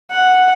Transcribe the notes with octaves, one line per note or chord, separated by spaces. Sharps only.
F#5